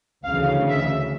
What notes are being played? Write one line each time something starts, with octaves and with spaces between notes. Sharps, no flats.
D2 C#3 E3 F5
E5